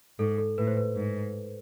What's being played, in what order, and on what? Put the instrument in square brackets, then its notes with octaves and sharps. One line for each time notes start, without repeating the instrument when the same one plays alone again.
[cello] G#2 [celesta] A4
[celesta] A4
[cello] A2 [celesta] B4
[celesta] C5
B4
[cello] G#2